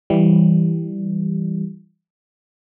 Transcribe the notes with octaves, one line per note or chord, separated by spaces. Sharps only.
E3 G3